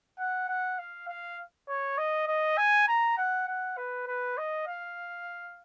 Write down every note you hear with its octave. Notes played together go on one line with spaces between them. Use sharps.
F#5
F#5
F5
F5
C#5
D#5
D#5
G#5
A#5
F#5
F#5
B4
B4
D#5
F5